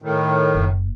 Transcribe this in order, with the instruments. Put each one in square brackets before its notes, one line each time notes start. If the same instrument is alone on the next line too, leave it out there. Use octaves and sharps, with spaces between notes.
[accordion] A2 D#3
[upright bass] F#1